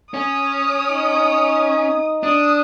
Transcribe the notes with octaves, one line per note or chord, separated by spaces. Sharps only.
C#4 D#6
D#4
D4 D#6